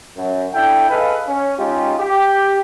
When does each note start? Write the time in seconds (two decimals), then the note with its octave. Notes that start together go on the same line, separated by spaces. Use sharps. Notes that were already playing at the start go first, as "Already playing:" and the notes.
0.17 F#2
0.54 D4 E4 A4 G5
0.89 G#4 A4 B4 D#5 F5
1.28 C#4
1.58 G#3 C#4 D#4 F4 G4
1.99 G4